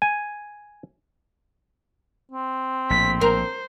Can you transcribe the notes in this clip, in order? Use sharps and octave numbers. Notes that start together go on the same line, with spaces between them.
G#5
C4
A#1 A2 B6
A#4 C5